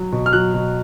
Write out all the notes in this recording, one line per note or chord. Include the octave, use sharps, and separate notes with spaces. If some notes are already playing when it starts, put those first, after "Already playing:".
Already playing: F#3
B2
F6
F#3 F#6
B2